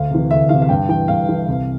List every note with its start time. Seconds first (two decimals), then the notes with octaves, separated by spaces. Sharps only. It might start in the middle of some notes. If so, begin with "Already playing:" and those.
Already playing: D2 F5
0.11 C3 E3
0.31 D2 E5
0.49 C3 E3 F5
0.62 F5
0.69 G2 G5
0.89 E3 G5
1.08 G2 F5
1.29 E3
1.48 C2